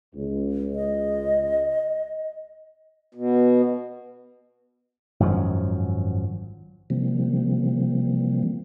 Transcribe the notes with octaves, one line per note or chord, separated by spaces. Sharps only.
C#2
D#5
B2
G#1 F#2 F3 F#3
C3 E3 F3 G3 A#3 C4